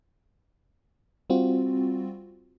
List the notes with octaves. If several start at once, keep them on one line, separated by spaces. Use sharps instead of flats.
G3 C4 F4 F#4